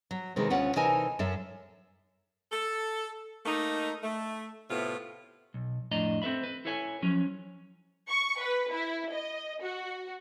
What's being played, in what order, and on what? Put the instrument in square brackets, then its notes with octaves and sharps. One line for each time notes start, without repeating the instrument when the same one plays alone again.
[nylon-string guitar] F#3
C3 D#3 E3 G#3
D2 C#4 F4 F#5
C3 E3 D#4 A4 A#4 G#5
F#2 A4 E5
[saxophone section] A4
A3 A#3 D#4
A3
A2 C3 A3 B3 F4
[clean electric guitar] B1
F2 A2 D4 D#5 A#5
C4 A4 B4 E5 B5
B4
E4 A4 B4 C#5 F5 G#5
F3 F#3 C#4 C#5
[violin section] C#6
B4
E4
D#5
F#4